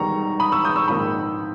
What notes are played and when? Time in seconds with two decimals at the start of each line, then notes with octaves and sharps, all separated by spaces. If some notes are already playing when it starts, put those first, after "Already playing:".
Already playing: E1 E2 D#3 G3 A#5 C#6
0.40 B5 D#6
0.52 C#6 E6
0.65 D#6 G6
0.76 C#6 E6
0.88 A#1 G#2 D#3 A#3 B5 D#6